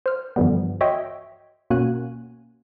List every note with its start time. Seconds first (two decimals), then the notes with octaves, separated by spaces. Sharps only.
0.06 C5 F6
0.36 G2 D3 E3 F3 G3 B3
0.81 F#4 C#5 D#5 E5 G5 C6
1.70 B2 A#3 C#4 F#4 G#5 F#6